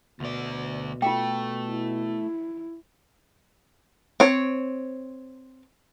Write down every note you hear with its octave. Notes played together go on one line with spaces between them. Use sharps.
D2 B2 D5
A3 F4 G5
E4
C4 C#5